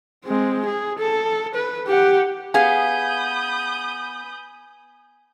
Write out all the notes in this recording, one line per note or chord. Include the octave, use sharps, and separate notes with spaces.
G#3 C4
G#4
A4
B4
G4 F#5
B3 G#4 F5 G#5 B5 D#6 G6 G#6